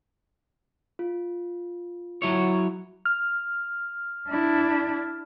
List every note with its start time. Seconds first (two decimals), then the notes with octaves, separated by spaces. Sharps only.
0.99 F4
2.22 F#3 E4 C#5
3.05 F6
4.28 D4 E4